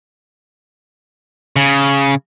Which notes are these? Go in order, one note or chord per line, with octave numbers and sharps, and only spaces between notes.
C#3